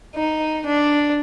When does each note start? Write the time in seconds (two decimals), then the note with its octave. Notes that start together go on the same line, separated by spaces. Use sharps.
0.15 D#4
0.66 D4